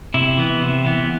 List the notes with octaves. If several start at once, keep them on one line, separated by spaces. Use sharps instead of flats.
C3 E4
E3 B3
C3
E3 B3